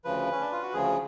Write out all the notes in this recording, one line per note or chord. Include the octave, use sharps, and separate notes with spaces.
D2 C#3 F3 B4
C#4
D4
F4
F#4
D2 C#3 F3 G#4